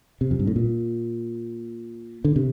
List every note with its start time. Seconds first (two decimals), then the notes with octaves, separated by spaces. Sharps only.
0.21 C3
0.31 F2
0.39 G2
0.47 A2
0.56 A#2
2.25 D3
2.36 C3